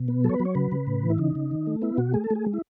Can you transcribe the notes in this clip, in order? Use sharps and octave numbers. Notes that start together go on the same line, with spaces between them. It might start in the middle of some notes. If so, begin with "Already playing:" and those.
Already playing: B2
B3
F#3 A4
C#5
B4
F#3
C#5
C#3 B4
C#3
A2
E3
E4
C#3 D#4
C#3
D#3
A3
B3 E4
B2 F#4
A3 G#4
A4
A3 G#4
G#3
E4